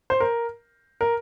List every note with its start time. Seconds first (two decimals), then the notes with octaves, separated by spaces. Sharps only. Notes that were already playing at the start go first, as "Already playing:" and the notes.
0.10 C5
0.20 A#4
1.01 A#4